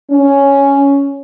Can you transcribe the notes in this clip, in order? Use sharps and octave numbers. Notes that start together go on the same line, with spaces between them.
C#4